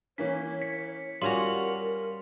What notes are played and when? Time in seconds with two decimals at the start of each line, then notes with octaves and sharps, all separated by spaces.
0.18 E3 A#3 C#4 C#5 B6
0.62 B6 C#7
1.22 G3 C#4 F4 F#4 A#4 C6 F7